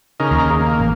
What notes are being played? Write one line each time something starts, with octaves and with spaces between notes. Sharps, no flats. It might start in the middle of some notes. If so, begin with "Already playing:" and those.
C#3 D#4 A#4
D#2
A#3
A1